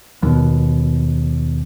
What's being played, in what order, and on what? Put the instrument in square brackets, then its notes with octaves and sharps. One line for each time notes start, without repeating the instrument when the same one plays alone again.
[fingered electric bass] D#2 B2